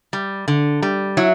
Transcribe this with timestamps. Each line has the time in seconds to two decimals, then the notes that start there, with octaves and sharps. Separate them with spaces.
0.13 G3
0.48 D3
0.82 G3
1.17 F#3 E4